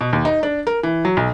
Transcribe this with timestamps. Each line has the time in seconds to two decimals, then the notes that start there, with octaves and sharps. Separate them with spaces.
0.01 B2
0.13 D#2
0.25 D#4
0.43 D4
0.67 A#4
0.83 E3
1.05 F#3
1.17 B1